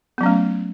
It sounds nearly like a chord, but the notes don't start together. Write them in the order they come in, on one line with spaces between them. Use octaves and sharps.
B3 F#3 C#4 A3